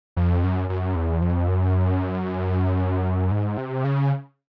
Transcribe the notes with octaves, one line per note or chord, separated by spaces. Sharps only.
F2
F#2
F#2
E2
F2
F#2
G#2
C3
C#3